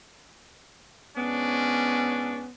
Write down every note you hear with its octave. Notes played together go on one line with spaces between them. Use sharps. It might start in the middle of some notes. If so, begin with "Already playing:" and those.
G#2 B3 C#4 D4